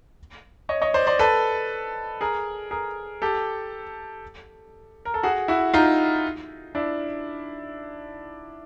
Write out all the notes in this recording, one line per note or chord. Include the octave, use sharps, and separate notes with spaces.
C#5 D#5
C#5 D#5
C5 D5
C5 D5
A4 B4
G#4 A#4
G#4 A#4
G4 A4
A#4
A4
F#4 G#4
E4 F#4
D#4 F4
D4 E4